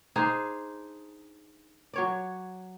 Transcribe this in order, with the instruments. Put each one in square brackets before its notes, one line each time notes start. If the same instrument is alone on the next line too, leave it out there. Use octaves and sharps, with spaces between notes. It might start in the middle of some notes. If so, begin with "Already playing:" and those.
[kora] D4 D#4 G#4 C5
F#3 C#5 D5